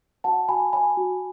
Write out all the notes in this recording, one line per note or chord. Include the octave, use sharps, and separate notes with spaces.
F#4 F#5 A5
F#4 G#5 B5
C#5 G#5 B5
F#4